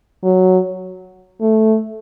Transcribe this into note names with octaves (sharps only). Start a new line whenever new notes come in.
F#3
A3